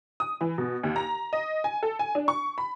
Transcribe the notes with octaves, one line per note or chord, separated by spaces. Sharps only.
D#6
E3
B2
D#2
A#5
D#5
G#5
A4
G#5
D4
C#6
B5